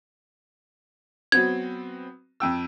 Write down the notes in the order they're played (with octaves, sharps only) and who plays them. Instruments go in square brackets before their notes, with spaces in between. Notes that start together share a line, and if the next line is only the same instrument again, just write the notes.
[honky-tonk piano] F#3 B3 C4 [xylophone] G#6
[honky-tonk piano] F2 G5 E6